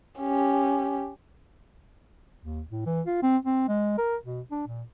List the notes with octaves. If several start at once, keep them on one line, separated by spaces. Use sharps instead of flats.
C#4 G4
D#2
A2
E3
F4
C4
C4
G#3
A#4
B2
D4
A#2